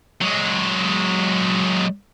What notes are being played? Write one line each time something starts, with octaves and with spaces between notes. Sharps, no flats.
F#3 G#3